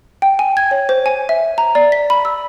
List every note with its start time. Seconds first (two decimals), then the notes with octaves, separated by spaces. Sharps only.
0.22 G5
0.39 G#5
0.57 G#6
0.71 C#5
0.89 C5
1.06 G#5
1.29 E5
1.58 A#5
1.75 D5
1.92 B6
2.10 B5
2.25 E6